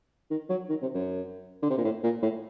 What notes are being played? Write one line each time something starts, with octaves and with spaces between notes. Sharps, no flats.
D#3
F#3
D#3
C3
F#2
D3
C3
A#2
A2
A#2
A2